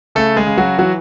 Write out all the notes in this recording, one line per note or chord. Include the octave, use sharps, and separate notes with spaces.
C#3 A3 A4
G#3 G#4
C#3
F#3 F#4
E3 F#3 F#4